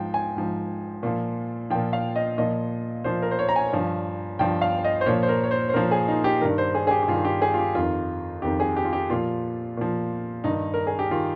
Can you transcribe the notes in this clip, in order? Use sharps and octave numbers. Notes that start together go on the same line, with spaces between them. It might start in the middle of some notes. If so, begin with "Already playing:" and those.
Already playing: G#2 F3 G5
G#5
G#2 F3
A#2 F3
A#2 F3 G5
F5
D#5
A#2 F3 D#5
A#2 F3 C5
A#4
C5
C#5
A#5
G#5
G2 F3
G2 F3 G5
F5
D#5
C5
A#2 F3 C#5
C5
A#4
C#5
C5
C5
A#2 F3 A#4
G#4
D#4
G4
G2 D#3 A#4
C5
G#4
G#4
G4
G4
G2 D#3 F4
G4
G#4
F4
G4
F2 D#3 F4
F2 D#3 G4
G#4
G4
F4
G4
A#2 F3 F4
A#2 F3
G2 D#3 D#4
A#4
G#4
G4
D#3 F4